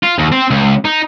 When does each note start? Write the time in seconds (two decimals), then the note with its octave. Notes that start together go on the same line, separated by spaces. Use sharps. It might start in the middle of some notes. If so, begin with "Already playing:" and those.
0.03 F4
0.19 D#2
0.32 C4
0.50 C#2
0.85 D#4